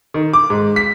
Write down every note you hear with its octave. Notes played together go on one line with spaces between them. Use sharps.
D#3
D6
G#2
B6